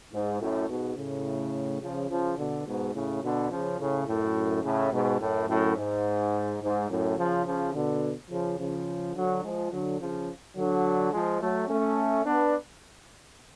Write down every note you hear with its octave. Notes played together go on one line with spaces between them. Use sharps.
G#2
F#2 A2
G#2 B2
A2 C#3
C#3 F3
C#3 F3
B2 D3
G#2 B2
A2 C#3
B2 D3
C#3 F3
A2 C#3
F#2 A2
A2 C#3
G#2 B2
F#2 A2
F#2 A2
G#2
G#2
F#2 A2
C#3 F3
C#3 F3
B2 D3
C#3 F3
C#3 F3
D3 F#3
F3 G#3
D3 F#3
C#3 F3
D3 F#3
F3 G#3
F#3 A3
A3 C#4
B3 D4